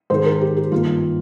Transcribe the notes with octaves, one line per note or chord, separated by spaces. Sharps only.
G#2 D#3 G#3 C5
A#4
G4
G4
G2 D#3 A#3 F4